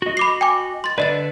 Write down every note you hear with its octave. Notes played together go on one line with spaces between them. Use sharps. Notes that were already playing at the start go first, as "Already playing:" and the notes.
F#4 D#5
B5 D6 C7
G5 G#5 D6
C6 A6
D3 D4 B4 D5 D#5 A6